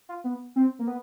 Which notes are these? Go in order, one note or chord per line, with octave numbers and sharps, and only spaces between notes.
F4
B3
C4
A#3
B3